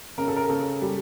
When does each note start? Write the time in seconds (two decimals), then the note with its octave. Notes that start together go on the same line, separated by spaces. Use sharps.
0.18 C#3 A#4
0.28 A4
0.36 A#4
0.50 C#3 A4
0.82 G3